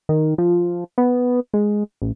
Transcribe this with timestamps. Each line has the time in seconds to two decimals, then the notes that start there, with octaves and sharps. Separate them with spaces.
0.09 D#3
0.38 F3
0.98 B3
1.54 G#3
2.02 A1